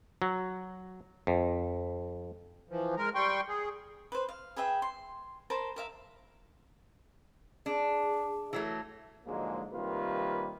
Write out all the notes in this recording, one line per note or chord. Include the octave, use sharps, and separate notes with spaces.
F#3
F2
E3 F3
G#3 A#4
G3 G5 C6 C#6
G#4
B4 C5
F5
G#4 B4 E5 G5
C6
A#4 C5 A5 B5
A#4 E5 F5
D4 G#4
E3 F#3 A3
G#2 D3 F3 F#3 G#3 A#3
C3 D#3 G3 A#3 F4 B4